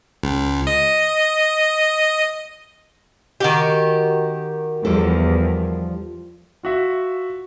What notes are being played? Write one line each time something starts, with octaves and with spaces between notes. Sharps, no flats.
C#2
D#5
D#3 F#4 G4
E2 F3 G3 A4
F4 F#4 E5